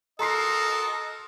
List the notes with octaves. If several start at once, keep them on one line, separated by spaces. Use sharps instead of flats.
F#4 A4 A#4 D#5 A#5 C6 C7